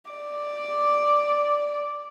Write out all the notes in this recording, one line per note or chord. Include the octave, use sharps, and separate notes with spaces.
D5